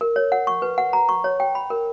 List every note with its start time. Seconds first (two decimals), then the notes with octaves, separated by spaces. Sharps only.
0.01 A#4
0.16 C#5
0.32 F#5
0.47 C#6
0.62 B4
0.78 F#5
0.93 A#5
1.09 C#6
1.24 C#5
1.40 G5
1.55 B5
1.70 A#4